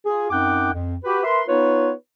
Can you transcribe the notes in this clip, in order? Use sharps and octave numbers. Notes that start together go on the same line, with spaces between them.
F4 G#4
F#2 C4 D#4 F#5 G5 D6
F2
F#4 G4 B4
A#4 B4 E5 C6
B3 D#4 F4 B4 C#5